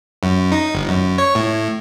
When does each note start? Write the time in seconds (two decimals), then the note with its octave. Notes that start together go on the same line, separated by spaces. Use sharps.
0.23 F#2
0.52 D#4
0.75 G1
0.88 F#2
1.18 C#5
1.35 A2